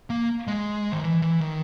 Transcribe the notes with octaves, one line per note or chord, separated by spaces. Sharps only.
A#3
G#3
D#3
E3
E3
D#3